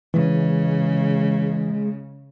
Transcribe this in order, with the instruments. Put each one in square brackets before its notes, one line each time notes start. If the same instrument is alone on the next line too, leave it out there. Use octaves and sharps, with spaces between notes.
[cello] C#3 [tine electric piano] E3 [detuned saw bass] G#3